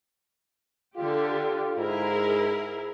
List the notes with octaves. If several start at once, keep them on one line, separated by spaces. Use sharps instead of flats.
D3 F4 G4
G#2 E4 G#4 A#4